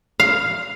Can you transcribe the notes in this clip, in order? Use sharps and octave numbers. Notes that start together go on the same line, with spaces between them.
F5